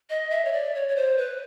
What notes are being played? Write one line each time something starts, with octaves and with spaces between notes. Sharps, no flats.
D#5
E5
C#5
D5
C#5
C#5
C5
B4